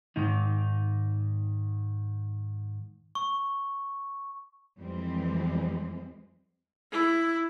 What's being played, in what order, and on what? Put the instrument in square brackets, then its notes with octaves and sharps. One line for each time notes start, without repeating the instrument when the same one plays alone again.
[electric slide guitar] G#2 D#3 D#4
[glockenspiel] C#6
[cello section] F2 E3 G3 G#3 C4
[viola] E4